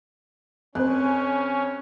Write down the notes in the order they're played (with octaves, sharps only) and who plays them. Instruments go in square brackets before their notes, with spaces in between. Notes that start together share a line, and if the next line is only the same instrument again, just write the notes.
[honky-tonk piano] F2 [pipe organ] C#4 [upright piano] C5 F#6